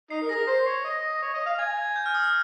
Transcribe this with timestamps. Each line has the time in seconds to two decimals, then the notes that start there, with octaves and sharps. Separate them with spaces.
0.10 D#4 C7
0.22 A#4
0.29 G#4 A#6
0.35 A#4
0.47 C5 C7
0.66 C#5 C7
0.85 D#5
1.22 C#5
1.34 D#5
1.46 F5
1.59 G#5 G#6
1.77 G#6
1.96 G6
2.06 F6
2.15 D#6
2.24 F6